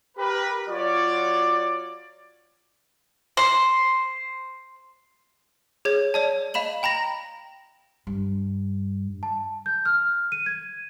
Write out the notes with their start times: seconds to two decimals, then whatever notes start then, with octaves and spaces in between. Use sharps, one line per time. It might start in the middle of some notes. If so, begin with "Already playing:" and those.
0.17 G4 A#4 B4
0.68 F#3 F4 F#4 C#5 D5
3.37 C5
5.85 G#4 C#5 G#6
6.14 C#5 D5 A5
6.54 D#5 F5 B5 E7 F#7
6.83 G5 A#5 B5 A#6
8.07 G2
9.23 A5
9.66 G6
9.85 F6
10.32 D#7
10.46 G#6